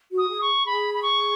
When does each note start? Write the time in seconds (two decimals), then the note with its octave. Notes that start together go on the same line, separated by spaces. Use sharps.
0.11 F#4
0.18 D#6
0.29 G#4
0.41 C#6
0.66 G#4 B5
0.94 B5
1.02 C#6